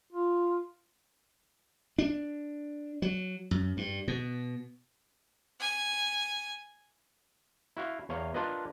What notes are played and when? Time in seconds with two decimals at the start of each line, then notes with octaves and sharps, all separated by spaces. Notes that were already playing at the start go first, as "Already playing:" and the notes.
0.12 F4
1.98 D4
3.02 F#3
3.51 F#2
3.77 G2
4.08 B2
5.60 G#5
7.77 E4 F#4 F5
8.09 E2 C#5 F5
8.34 D4 F4 A#4 B4 D#5